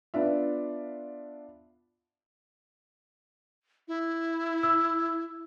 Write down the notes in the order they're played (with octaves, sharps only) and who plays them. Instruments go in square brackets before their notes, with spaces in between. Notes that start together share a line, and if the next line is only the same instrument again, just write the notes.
[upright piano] B3 D4 F4 E5
[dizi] E4
[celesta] E6